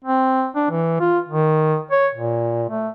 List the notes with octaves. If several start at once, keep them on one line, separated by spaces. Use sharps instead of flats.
C4
D4
E3
F4
D#3
C#5
A#2
A3